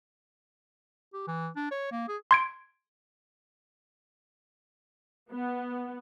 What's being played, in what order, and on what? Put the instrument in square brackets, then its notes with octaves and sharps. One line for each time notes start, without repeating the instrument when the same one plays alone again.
[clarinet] G4
E3
D4
C#5
A#3
G#4
[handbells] C6 G#6 D7
[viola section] B3